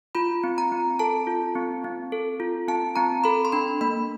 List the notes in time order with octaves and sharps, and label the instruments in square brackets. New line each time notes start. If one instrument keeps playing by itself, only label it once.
[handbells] F4 B5
C4
A#5
C4
A4 A5
F4
C4
C4
A4
F4
C4 A5
C4 A#5
A4 B5
C6
D4 B5
A#3 B5